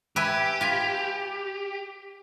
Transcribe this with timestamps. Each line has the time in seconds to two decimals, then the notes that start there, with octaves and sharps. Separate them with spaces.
0.16 G4 B4 E5 G#5
0.61 F4 G#5